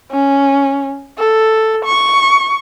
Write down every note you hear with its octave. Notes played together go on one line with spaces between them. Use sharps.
C#4
A4
C#6